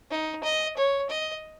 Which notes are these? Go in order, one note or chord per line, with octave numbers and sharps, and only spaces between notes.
D#4
D#5
C#5
D#5